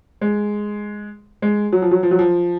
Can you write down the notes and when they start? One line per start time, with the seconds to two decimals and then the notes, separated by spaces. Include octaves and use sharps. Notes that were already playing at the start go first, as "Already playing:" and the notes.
0.21 G#3
1.42 G#3
1.73 F#3
1.82 F3
1.91 F#3
2.03 F3
2.11 F#3
2.19 F3